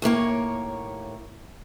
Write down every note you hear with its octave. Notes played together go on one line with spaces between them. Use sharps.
D#2 A2 A#3 C#5